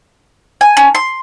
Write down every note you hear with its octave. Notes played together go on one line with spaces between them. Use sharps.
G#5
C#4
C6